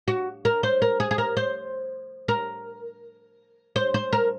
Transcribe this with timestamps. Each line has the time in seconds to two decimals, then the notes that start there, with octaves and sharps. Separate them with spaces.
0.08 F#4
0.45 A#4
0.63 C5
0.82 A#4
1.00 G#4
1.11 G#4
1.18 A#4
1.37 C5
2.28 A#4
3.76 C5
3.94 C5
4.13 A#4